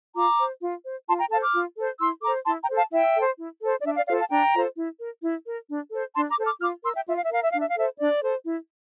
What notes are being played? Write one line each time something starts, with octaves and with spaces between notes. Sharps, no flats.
F4 A#5 D6
C5
F4
C5
F4 A5 C6
G5 A#5
A4 C5 F5 A5
D6 F6
F4
A4 C5
E4 C6 E6
A4 C5 A#5 D6
E4 A5 C6
G5 A#5
A4 C5
F5 A5
E4 E5 G5
A4 C5
E4
A4 C5
D5
D4 E5
D5 F5
F4 A4 C5 D5 F5
F5 A5
D4 G5 A#5
F4 A4 C5
E4
A#4
E4
A#4
D4
A4 C5
D4 A5 C6
A#5 D6
A4 C5
D6 F6
F4 D6 F6
A#4 C6 E6
E5 G5
F4 E5
F5
E5
A#4 F5
E5
D4 F5
E5
F5
A4 C5 E5
D4 D5
A4 C5
E4